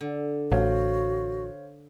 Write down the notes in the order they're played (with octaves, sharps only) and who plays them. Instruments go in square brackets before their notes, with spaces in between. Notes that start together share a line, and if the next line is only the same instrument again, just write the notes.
[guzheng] D3
[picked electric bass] A1 [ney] F#4 [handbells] C5 C#5 F5